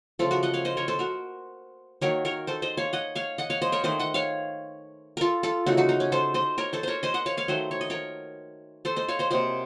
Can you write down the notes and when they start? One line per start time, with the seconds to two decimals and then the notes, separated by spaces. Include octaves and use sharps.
0.19 C#3 F3 A3 F4 A4
0.31 F#4 A#4
0.43 D#5 F#5
0.54 C#5 F5
0.65 C5 D#5
0.77 A#4 C#5
0.88 A4 C5
0.99 F#4 A#4
2.01 D#3 F#3 A#3 A#4 C#5
2.25 A#4 C#5
2.47 A4 C5
2.62 C5 D#5
2.77 C#5 F5
2.93 D#5 F#5
3.16 C#5 F5
3.38 D#5 F#5
3.50 C#5 F5
3.62 C5 D#5
3.72 A#4 C#5
3.84 D#3 A3 C5 D#5
3.99 D#5 F#5
4.14 C#5 F5
5.17 F4 A4 A#4
5.43 F4 A4
5.67 C#3 A3 D#4 F#4
5.77 D#4 F#4
5.89 D#4
6.00 C#4
6.12 A4 C5
6.34 C5 D#5
6.58 A#4 C#5
6.73 A4 C5
6.83 A#4 C5 C#5
7.03 C5 D#5
7.14 D#5 F#5
7.26 C#5 F5
7.37 C#5 F5
7.48 D#3 F#3 A3 C5 D#5
7.71 C#5
7.81 D#5
7.90 A#4 C#5
8.85 A4 C5
8.96 C5 D#5
9.08 C#5 F5
9.19 C5 D#5
9.30 C3 F#3 A#3 C5 D#5